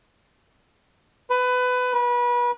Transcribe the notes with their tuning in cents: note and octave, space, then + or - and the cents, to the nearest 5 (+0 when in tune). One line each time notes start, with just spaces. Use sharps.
B4 +20
B4 -30